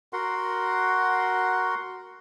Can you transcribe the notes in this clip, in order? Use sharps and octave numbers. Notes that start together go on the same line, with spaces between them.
F#4 A#4 F#5 C6